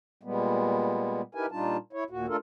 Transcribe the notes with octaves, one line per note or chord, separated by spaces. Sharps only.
A#2 G3 G#3 B3
D#4 E4 G4 A#4 B4 G#5
A#2 G3 D4 D#4 F4 A5
E4 C#5
D#2 A#2 F#4
A3 D4 F4 A4 A#4